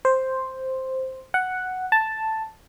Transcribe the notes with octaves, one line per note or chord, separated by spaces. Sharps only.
C5
F#5
A5